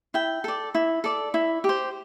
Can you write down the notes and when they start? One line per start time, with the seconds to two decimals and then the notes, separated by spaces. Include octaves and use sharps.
0.14 E4 G5
0.44 A4 D5
0.75 E4
1.04 A4 D5
1.34 E4
1.64 G4
1.69 C5